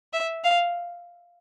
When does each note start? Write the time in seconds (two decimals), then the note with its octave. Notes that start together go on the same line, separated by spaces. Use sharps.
0.13 E5
0.44 F5